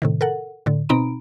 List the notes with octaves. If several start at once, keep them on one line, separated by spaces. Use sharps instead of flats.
A2 C3 D#3
A4 A#4 F#5
A2 D3
B2 C4 D#4 A#5 B5 D7